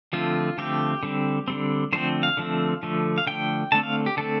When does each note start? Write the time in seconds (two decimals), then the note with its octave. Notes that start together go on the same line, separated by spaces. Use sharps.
0.13 D3 F3 A3 C4 F4
0.58 D3 F3 A3 C4 G4
1.03 D3 G3 C4
1.48 D3 G3 C4
1.93 D3 F3 A3 C4 C5
2.23 F5
2.37 D3 F3 A3 C4
2.83 D3 F3 A3
3.18 F5
3.27 D3 F3 A3 G5
3.72 D3 A3 C4 A5
3.83 F5
4.06 G4
4.17 D3 A3 C4 A4